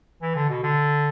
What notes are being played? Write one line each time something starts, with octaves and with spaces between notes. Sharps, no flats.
E3
D3
B2
D3